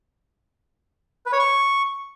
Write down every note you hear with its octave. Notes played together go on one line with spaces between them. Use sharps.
B4
C#5
C#6